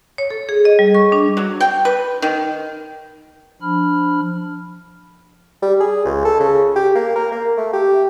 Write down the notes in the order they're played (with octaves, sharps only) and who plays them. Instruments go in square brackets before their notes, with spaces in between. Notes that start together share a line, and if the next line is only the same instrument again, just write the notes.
[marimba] C#5
A4
G#4
D#5
G3
C#6
D4
[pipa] F#3
G5
B4
D#3
[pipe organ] F3 D4 B5 F6
[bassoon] G3
G#4
C#2
A4
C#3
G4
A#3
A#4
A#3
A3
G4